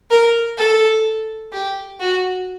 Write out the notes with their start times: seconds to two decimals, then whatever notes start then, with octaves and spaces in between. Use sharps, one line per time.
0.10 A#4
0.58 A4
1.53 G4
2.00 F#4